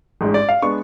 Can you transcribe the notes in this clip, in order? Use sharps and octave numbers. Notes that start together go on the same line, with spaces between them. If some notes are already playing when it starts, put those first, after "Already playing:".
A1 G#2 G#3 D4
D5
F5
G#3 B3 D4 C#6